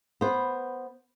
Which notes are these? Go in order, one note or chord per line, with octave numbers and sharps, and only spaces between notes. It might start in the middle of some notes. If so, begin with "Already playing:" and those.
B3 C5